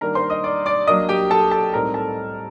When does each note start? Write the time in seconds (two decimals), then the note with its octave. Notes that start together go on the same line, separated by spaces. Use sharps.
0.01 D#3 G3 A#3 D4 A#4 A#5
0.15 C5 C6
0.30 D#5 D#6
0.44 D5 D6
0.66 D5 D6
0.87 F#3 A#3 D4 D#5 D#6
1.09 G4 G5
1.30 A4 A5
1.51 A4 A5
1.73 A2 G3 C4 D#4 A#4 A#5
1.94 A4 A5